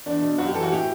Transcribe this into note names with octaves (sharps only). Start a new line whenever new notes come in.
E2 D4
B2
F#2 F#4
G4
E3 A4
F#4
A2 G4